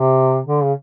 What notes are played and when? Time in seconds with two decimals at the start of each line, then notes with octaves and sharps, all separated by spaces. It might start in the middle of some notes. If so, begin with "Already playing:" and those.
Already playing: C3
0.47 D3
0.64 C#3